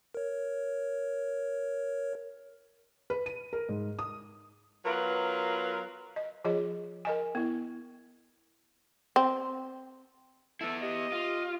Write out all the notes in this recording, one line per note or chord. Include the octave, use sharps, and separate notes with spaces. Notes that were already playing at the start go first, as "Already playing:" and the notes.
A#4 C#5
B4
D#7
A#4
G#2
D#6
F#3 B3 F4 A#4 B4
D#5
F3 F4 G#4 D#5
A#4 D#5 G#5
B3 E4
C4
B3 E4 A4
G4 D#5
F4